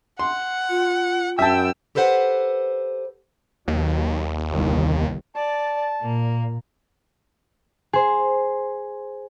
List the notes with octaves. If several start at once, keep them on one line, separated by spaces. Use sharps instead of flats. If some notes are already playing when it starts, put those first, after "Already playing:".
F#5 C6
F4
F#2 E5 G5 A5 E6
G4 A4 B4 C5 E5 F#5
D#2 B2 F#3
G1 C2 D#3
D5 A5
A#2 A#3
G#4 C5